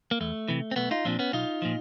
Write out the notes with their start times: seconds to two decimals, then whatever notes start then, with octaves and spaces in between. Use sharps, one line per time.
0.11 A#3
0.20 E2 A3
0.48 C3 E3
0.71 C4
0.76 B1 A3 B3
0.91 D#4 F4
1.05 A#2 F3 C4 D4
1.19 B3 C#4
1.33 B1 D#4 F4
1.62 A#2 F3